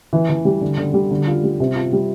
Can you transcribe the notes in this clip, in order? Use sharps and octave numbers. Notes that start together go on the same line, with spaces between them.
E3
E3
G3
D3
D3
G3
D3
F4
G3
C3
F4
G3